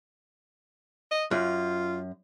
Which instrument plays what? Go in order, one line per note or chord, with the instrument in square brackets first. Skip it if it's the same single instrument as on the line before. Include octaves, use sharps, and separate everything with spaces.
[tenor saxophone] D#5
[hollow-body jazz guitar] F#2 [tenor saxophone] F4